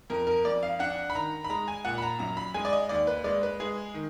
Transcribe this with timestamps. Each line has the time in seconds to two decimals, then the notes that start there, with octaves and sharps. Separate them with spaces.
0.10 F2 A#4
0.27 A#4
0.45 F2 D5
0.63 F5
0.79 D4 F#5
1.10 B5
1.15 D#3 A#5
1.44 B5
1.50 G#3 A#5
1.68 G#5
1.85 A#2 F#5
1.98 B5
2.02 A#5
2.19 F#2 A#5
2.37 B5
2.54 G#3 G#5
2.65 D5
2.73 D#5
2.89 D#2 D5
3.07 B4
3.24 G#3 D5
3.43 B4
3.60 G#3 G#4
3.94 D#3